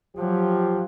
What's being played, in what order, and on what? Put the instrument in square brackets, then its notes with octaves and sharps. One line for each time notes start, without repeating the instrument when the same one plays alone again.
[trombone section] F3 F4 G4 [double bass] F#3